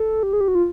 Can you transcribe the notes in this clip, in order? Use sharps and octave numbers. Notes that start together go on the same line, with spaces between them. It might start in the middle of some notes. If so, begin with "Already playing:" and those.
Already playing: A4
G4
G#4
G4
F#4
F4